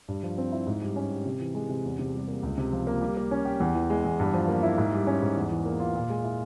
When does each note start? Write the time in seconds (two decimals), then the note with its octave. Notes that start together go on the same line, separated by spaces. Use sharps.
0.08 G2
0.23 F3
0.38 C4
0.52 E4
0.67 G#2
0.82 G3
0.96 C#4
1.11 G4
1.26 C3
1.40 E3
1.55 G#3
1.69 C3
1.85 E2
1.99 C3
2.14 G3
2.28 A#3
2.43 C#2
2.58 C3
2.72 F3
2.87 A#3
3.01 G3
3.17 A#3
3.31 C#4
3.45 G4
3.60 E2
3.75 E3
3.90 G#3
4.04 E2
4.20 G2
4.34 F3
4.48 A#3
4.63 E4
4.78 G#2
4.92 G3
5.07 C#4
5.22 G#2
5.36 E2
5.51 E3
5.65 A#3
5.80 F4
5.95 A#2
6.10 G#3
6.24 E4